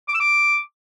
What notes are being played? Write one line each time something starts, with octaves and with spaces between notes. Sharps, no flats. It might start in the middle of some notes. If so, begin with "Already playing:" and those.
D6
E6
D6